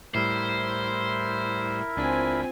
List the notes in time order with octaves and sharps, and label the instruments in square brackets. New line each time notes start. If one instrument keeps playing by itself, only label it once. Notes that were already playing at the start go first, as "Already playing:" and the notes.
[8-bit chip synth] A2 G3 [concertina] E4 A#4 E5 [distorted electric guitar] C5
[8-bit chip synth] C#2 D4 B6 [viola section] C4 F4 G#5